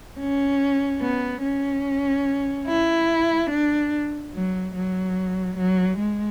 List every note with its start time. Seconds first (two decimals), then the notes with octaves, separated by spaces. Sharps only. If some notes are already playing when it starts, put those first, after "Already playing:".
0.20 C#4
1.01 B3
1.43 C#4
2.67 E4
3.50 D4
4.33 F#3
4.75 F#3
5.57 F#3
5.99 G#3